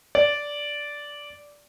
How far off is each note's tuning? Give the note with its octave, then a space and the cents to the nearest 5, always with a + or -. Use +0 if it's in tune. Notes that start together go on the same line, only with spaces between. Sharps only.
D5 -10